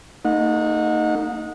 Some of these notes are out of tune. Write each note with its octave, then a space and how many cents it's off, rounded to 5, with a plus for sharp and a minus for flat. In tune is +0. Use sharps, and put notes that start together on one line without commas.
A#3 -45 D#4 +0 F#5 -35